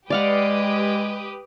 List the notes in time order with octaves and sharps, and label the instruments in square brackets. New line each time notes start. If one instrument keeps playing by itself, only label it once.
[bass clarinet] G#3 [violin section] G4 B4 D#6 [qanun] D5 F5 F#5